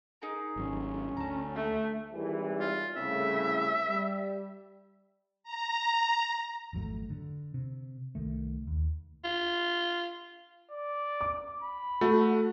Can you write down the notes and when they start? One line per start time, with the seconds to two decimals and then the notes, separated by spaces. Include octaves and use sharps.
0.22 D#4 G#4 A#4
0.56 G#1 F#3 C#4
1.17 D2 A5 A#5
1.55 A3
2.13 G#1 E3 G3
2.60 F4
2.96 C2 A2 C#3 E5
3.87 G3
5.43 A#5
6.73 G#1 F2 F#3 A3
7.10 D3
7.54 C3
8.15 C2 D#3 A3
8.67 D#2
9.24 F4
10.71 D5
11.21 D6
11.62 B5
12.01 A3 F#4 A4